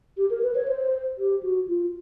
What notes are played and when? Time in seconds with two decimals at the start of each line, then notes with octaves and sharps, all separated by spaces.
0.17 G4
0.30 A#4
0.43 B4
0.55 C#5
0.68 C5
1.18 G4
1.43 F#4
1.68 F4